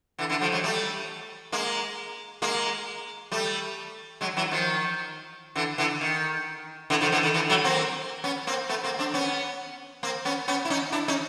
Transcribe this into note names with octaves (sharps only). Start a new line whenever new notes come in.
D3 E3
D3 E3
F3 G3
F#3 G#3
G3 A3
G#3 A#3
G#3 A#3
G3 A3
F#3 G#3
E3 F#3
D#3 F3
D3 E3
D3 E3
D#3
D3 E3
D#3 F3
D3 E3
D#3
D3 E3
E3 F#3
A#3 C4
B3 C#4
A#3 C4
A3 B3
A#3 C4
C4 D4
B3 C#4
A#3 C4
B3 C#4
B3 C#4
E4
C#4 D#4
D4 E4
C#4 D#4